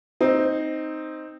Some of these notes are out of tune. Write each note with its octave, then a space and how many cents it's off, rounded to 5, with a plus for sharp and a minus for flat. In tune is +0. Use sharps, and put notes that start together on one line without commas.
C4 +0 D#4 +0